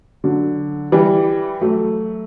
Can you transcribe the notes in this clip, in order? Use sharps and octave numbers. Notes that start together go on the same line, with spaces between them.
D3 F#3
E3 G3
F#3 A3